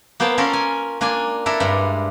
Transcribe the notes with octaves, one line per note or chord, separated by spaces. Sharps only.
A#3 B3 C5 C#5 G5 A5
A#3 C#4 F4 A4 A#4 C#5
G#5
A#3 D4 F4 G#5
D4 E4 A4 A#4
G2 G#3